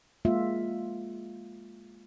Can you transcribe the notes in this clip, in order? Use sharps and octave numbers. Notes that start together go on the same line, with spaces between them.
G#3 A#3 F4 E5